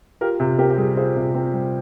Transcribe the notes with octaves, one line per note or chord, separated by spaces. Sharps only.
F4 G4 A#4
C3
C4 G4 A#4
G4
G3 G#4
F4 G#4 C5
C3
C4
G3